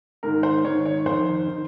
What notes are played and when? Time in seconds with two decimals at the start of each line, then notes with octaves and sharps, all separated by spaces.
0.23 G#2 D#3 A#4
0.43 C5
0.64 G#2 D#3 C#5
0.85 C#5
1.06 F2 D#3 C5
1.48 D#3